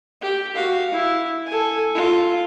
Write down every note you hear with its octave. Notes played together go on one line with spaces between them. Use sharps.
G4
F#4 F5
E4
A4 G#5
F4